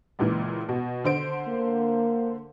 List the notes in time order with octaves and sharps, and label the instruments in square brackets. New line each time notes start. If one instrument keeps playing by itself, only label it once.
[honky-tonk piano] C#2 A#2 E3
B2
D3 C5 D7
[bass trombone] A#3